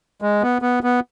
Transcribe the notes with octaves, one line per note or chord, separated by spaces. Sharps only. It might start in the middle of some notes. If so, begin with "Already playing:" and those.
G#3
B3
B3
B3